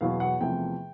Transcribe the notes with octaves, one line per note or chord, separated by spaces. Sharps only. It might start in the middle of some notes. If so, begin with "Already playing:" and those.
E2 B2 F#3 B3 F5
F#5
E2 C3 F3 A3 G5